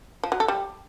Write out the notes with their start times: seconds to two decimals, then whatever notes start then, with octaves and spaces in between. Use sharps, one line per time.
0.23 F3
0.32 F#3
0.40 A4
0.48 G3